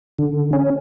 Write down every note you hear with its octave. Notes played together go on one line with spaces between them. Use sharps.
D3
C#4